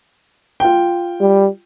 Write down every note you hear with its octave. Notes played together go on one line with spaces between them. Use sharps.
F4 G5
G3